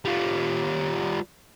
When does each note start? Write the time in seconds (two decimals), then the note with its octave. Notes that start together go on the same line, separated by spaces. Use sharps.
0.05 G3 F4